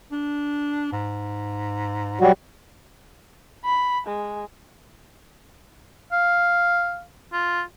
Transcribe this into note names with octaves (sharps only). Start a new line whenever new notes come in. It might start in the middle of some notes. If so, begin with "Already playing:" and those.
D4
G#2
B2 F#3 G3 F#4
B5
G#3
F5
F4